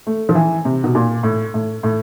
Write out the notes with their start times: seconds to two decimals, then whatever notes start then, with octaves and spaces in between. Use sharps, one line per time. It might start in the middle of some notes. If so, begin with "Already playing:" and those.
0.07 A3
0.29 F3
0.35 E3
0.65 C3
0.84 B2
0.95 A#2
1.23 A2
1.54 A2
1.83 A2